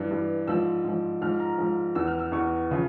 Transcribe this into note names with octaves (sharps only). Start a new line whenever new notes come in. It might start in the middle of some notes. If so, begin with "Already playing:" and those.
Already playing: G2 E3
G2 E3
G#2 F3 E6
G#2 F3
G#2 F3 F6
A#5
G#2 F3
E2 E3 E6
F6
E6
E2 E3 C#6
C#3 F3